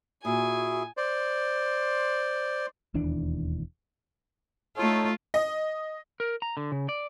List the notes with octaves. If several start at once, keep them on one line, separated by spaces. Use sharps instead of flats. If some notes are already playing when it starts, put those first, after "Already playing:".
A#2 E4 F#4 G#4 G#5
C5 D5
E1 D#2 E3 D4
A3 D#4 F4 A4 C#5
D#5
A#4
A#5
D3
C#3
D5